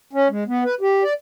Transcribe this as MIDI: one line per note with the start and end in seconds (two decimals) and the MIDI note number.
0.13 0.28 61
0.30 0.44 56
0.48 0.64 59
0.64 0.75 71
0.81 1.03 67
1.03 1.13 74